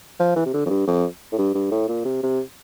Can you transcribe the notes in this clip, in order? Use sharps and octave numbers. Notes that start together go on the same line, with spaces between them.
F3
E3
C3
D3
F2
G2
F2
A2
G2
G2
A2
A#2
C3
C3